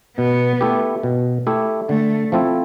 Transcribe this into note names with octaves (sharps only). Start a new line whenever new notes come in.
B2 B3
A3 E4 G4
B2
A3 E4 G4
D3 A3
F3 A3 C4 E4